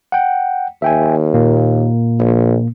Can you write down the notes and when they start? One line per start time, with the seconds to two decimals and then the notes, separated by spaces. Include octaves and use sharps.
0.12 F#5 G5
0.82 D#2 E5 G5 G#5
1.34 A#2 A#3
2.19 A#1